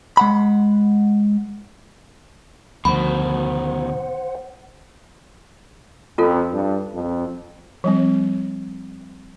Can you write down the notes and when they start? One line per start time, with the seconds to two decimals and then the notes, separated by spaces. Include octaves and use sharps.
0.17 G#3 F#5 B5
2.85 D2 B2 D#3 F3 C5 F#5 B5
6.18 F2 C#4 F4 A4
6.53 G2
6.94 F2
7.84 F3 G3 C4